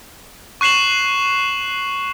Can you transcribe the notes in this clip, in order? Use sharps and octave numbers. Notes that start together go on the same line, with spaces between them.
C#6 F#6 C7 E7 F#7